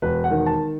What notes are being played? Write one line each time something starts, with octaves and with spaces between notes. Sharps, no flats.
E1 B4
F#5
D#3
A5